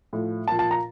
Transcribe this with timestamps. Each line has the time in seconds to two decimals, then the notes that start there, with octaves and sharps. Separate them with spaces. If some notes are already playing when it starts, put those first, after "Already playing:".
0.13 A2 F3
0.48 A#2 F3 A5
0.59 A5
0.71 A#5